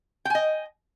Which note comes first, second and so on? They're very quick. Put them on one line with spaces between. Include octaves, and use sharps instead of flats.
G5 G#5 D#5